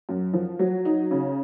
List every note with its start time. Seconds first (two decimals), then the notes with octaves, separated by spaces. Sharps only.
0.09 F#2
0.33 F3
0.59 F#3
0.85 D#4
1.11 C#3